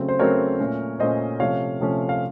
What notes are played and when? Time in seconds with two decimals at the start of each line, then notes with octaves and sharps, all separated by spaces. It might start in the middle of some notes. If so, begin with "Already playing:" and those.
Already playing: C#3 F#3 A3 C4
0.08 C5
0.19 C#3 F#3 A3 C4 A#4 C#5
0.60 A#2 A3 C#4
0.99 A#2 A3 C#4 C5 D#5
1.40 C3 F3 A3 C#4 C#5 F5
1.80 C3 F3 A3 C#4
2.09 F5